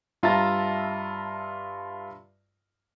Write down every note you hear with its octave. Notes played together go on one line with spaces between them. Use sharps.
G2 F4 E5 A5 A#5 A6